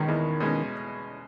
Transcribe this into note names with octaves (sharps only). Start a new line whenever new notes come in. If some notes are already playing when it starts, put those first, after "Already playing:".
Already playing: B2 D#3 G#3 C#4
E2
B2 G#3 C#4